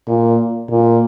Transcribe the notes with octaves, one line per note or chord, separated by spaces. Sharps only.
A#2
A#2